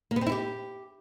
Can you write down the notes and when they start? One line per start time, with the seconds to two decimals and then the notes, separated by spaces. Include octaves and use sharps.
0.11 A#3
0.16 B3
0.21 C4
0.27 E4
0.32 G4